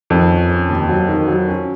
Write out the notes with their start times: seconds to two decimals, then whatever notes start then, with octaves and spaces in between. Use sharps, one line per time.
0.10 F2 D#3
0.30 C#4
0.50 C#4
0.69 D#2
0.89 F#3
1.09 D#3
1.28 F#3
1.48 C#4